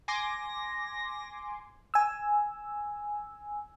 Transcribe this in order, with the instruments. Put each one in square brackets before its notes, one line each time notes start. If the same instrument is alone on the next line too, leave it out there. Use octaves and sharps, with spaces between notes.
[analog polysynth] G#5 C6 D6 [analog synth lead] A#6
[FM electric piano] G#5 E6